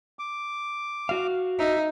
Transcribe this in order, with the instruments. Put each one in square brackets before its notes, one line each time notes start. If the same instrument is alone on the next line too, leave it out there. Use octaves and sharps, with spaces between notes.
[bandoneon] D6
[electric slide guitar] F#4 F5
[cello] D#4 [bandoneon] E5